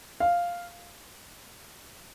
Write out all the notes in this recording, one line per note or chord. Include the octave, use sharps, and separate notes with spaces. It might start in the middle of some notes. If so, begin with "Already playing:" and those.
F5